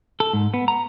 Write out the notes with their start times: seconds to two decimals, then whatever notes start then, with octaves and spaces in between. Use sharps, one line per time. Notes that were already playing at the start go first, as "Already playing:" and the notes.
0.20 A4
0.33 G#2
0.54 B3
0.68 A#5